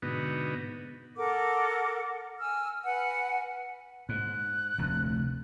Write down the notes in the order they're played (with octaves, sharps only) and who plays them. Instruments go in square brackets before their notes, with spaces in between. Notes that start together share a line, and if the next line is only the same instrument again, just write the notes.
[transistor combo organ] G#2 B2 D3 B3 D#4 F#4
[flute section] A4 A#4 F#5 D6
G#5 E6 F6
B4 F#5 G#5
[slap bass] G#2 [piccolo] F#6
[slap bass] F1 D2